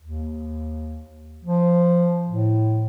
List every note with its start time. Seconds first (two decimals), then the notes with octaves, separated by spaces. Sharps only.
0.02 D#2
1.45 F3
2.28 A2